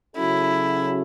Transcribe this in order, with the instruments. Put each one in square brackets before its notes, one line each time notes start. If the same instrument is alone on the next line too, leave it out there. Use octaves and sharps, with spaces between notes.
[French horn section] C#3 F#3 C#4 F#4 A4 [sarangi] E4